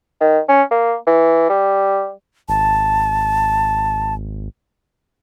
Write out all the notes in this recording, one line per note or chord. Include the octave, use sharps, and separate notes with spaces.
D#3
C#4
A#3
E3
G3
G#1 A5